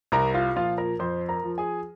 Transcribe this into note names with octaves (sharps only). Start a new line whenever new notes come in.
C2 A#4 A#5
F4 F5
A#2 F3 F4 F5
A#4 A#5
F2 C5 C6
A#4 A#5
F3
G#4 G#5